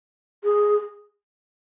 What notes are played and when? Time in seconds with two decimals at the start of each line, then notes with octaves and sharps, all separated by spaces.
0.44 G#4